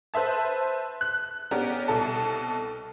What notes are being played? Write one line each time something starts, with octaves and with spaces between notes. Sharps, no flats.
B4 C5 E5 A5
F#6
B3 C#4 D4 G4 A#5
C2 B2 A4